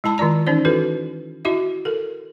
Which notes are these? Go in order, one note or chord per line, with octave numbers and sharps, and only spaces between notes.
G#3 E4 A5 B5 D6
D#3 G#3 F4 D5 A#5
E3 C#4 D#4 C5 D5
E4 F#4 A4 B4
E4 F#4 D#5 E5
A4 A#4